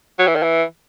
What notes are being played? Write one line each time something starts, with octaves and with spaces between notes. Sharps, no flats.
F#3
E3
D#3
E3